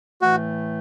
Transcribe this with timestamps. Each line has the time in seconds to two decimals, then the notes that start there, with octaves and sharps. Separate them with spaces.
0.21 A2 E3 A3 F#4